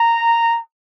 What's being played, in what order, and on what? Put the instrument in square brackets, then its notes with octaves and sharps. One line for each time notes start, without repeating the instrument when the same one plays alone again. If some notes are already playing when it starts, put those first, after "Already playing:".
Already playing: [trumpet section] A#5